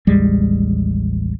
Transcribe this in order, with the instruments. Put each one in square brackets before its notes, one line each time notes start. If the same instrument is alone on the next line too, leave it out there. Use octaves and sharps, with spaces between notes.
[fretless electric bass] A1 D#2 G3 G#3